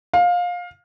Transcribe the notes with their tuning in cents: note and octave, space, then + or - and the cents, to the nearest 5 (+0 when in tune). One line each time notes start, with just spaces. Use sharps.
F5 +20